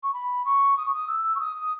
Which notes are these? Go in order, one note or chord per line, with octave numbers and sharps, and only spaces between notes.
C#6
B5
C#6
D#6
C#6
D#6
E6
C#6
D#6